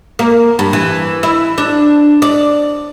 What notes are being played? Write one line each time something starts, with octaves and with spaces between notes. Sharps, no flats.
A#3
G2
E3
E4
D4
D5